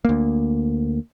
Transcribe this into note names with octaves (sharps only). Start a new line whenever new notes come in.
D2 A#3